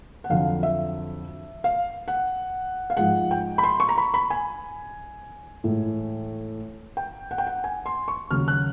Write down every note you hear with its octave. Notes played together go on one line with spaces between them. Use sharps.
F#5
F2 D3 F#3 F5
E5
F5
F#5
F5
G#2 F3 G#3 F#5
G5
B5
C6
C#6
A#5
B5
B5
G#5
A2 E3 G#3
G5
F#5
G5
F#5
G#5
C6
C#6
D#2 C#3 F#3 F6
F#6